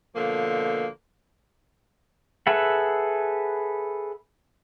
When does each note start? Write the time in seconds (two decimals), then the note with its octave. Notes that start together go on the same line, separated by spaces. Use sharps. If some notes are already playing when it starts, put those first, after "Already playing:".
0.16 B2 D3 F3 A#3
2.47 G#4 A4 B4 E5 F#5